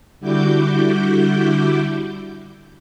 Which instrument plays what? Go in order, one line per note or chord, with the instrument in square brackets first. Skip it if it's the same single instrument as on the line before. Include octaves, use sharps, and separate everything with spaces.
[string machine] D3 G3 E4 F#4 D6 G6